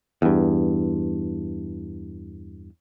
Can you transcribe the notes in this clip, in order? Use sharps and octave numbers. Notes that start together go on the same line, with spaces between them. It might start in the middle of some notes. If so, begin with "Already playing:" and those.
E2 G2